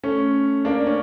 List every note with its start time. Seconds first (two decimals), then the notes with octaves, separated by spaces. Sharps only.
0.03 A3 C#4
0.65 A#3 D4
0.87 C#4